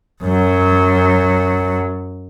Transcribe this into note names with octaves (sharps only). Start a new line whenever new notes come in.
F#2 F#3